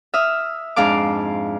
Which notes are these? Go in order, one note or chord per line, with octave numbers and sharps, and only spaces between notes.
E5 D#6 F6
F2 G#2 D4 F5 D6